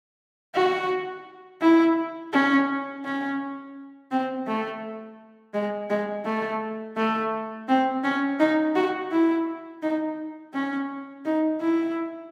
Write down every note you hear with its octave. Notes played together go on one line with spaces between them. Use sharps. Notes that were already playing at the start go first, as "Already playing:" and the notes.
F#4
E4
C#4
C#4
C4
A3
G#3
G#3
A3
A3
C4
C#4
D#4
F#4
E4
D#4
C#4
D#4
E4